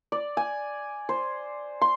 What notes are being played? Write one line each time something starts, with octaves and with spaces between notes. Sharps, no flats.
D5
G#5
C5
C6